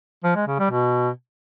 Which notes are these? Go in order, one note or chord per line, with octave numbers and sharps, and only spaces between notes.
F3
G#3
C#3
G3
B2